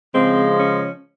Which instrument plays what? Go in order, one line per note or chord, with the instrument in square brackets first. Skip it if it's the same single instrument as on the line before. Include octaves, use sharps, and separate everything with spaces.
[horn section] C#3 F3 G#3 C4
C#4